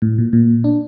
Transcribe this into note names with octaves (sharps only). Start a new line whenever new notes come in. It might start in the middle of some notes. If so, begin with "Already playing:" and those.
A2
A#2
A#2
D4